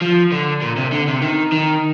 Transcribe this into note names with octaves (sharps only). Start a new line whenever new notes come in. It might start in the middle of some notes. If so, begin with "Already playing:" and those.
F3
D3
A#2
C3
D3
C3
D#3
D#3